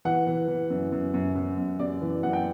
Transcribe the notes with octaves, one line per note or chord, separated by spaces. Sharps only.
E3 F#5
E3
E3
F#2
F#2
F#2
F#2
F#2
F#2 D5
E3
F#2 F#5
G5